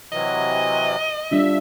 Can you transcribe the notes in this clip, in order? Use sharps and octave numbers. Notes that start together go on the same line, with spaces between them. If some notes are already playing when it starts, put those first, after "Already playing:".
C3 E3 F#3 D#5
G3 D4 F4 E5